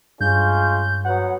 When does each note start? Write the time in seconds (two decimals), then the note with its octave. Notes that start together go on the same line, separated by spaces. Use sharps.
0.21 G2 G#3 C#4 F4 G6
1.05 F#3 B3 F#5